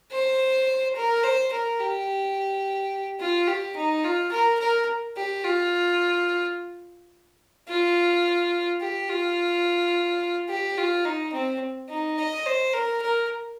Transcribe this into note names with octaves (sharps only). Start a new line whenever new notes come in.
C5
A#4
C5
A#4
G4
F4
G4
D#4
F4
A#4
A#4
G4
F4
F4
G4
F4
G4
F4
D#4
C4
D#4
D#5
C5
A#4
A#4